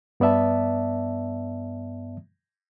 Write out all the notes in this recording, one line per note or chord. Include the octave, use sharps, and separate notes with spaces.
G2 B3 D5 E5 A5